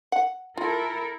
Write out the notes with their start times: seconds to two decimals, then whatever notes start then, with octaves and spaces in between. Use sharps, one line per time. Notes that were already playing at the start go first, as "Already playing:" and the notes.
0.12 F#5
0.57 E4 F4 A4 A#4